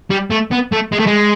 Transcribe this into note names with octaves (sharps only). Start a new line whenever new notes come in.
G3
A3
B3
A3
G#3
A3
G#3